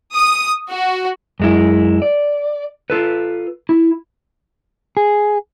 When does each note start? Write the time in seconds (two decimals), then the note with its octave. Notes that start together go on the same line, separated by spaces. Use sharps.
0.14 D#6
0.70 F#4
1.40 F#2 G#3 E4
2.02 D5
2.90 F4 A4 B4
3.69 E4
4.97 G#4